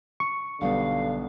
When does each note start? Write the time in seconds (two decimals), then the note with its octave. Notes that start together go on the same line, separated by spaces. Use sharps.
0.20 C#6
0.61 B1 D3 G3 B3 F5